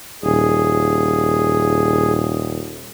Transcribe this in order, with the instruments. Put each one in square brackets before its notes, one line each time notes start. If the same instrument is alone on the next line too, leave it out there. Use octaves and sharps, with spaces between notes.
[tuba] D#1 [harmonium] G#4